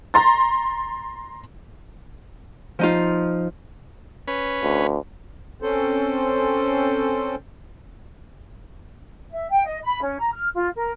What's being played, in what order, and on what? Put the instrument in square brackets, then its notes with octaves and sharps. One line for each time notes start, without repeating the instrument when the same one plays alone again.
[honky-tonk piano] A#5 C6 A6
[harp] F3 D#4 F4
[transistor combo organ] C#4 B4
[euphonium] D2
[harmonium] C4 C#4 A4 C5
[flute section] E5
G5
D#5
B5
C#4
A#5
F6
F4
A#4